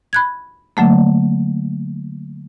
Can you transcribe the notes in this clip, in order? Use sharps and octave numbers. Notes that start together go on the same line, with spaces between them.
B5 F#6 G#6
D3 F#3 A3 A#3